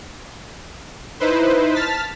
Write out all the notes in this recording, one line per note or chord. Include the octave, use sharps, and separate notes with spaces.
D#4 E4 B4 C5
A5 F6 A6 B6